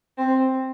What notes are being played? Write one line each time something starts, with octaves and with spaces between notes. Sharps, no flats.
C4